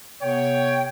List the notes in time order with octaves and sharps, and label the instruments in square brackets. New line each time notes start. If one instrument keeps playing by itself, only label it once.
[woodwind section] C3 B3 G5 [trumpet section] C#5